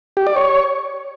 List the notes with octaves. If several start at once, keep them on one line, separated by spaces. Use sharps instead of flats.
G4
D5
C#5